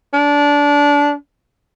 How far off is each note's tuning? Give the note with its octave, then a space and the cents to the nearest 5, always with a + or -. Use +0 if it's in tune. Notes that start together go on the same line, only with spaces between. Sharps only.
D4 -20